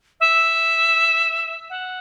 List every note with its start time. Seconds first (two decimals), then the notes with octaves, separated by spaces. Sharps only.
0.20 E5
1.70 F#5